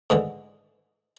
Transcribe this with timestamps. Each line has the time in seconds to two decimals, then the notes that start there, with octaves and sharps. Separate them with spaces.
0.10 G#2 D3 E3